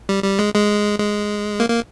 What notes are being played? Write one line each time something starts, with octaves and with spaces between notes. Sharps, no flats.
G3
G3
G#3
G#3
G#3
A#3
A#3